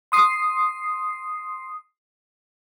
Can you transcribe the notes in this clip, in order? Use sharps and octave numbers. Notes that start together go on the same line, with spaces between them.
C6 D#6 C7